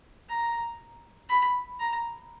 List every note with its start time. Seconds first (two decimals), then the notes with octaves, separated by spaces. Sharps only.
0.29 A#5
1.29 B5
1.79 A#5